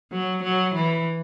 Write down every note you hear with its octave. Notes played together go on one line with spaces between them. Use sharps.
F#3
F#3
E3